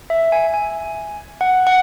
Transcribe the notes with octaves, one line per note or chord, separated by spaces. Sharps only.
E5
G#5
G#5
F#5
F#5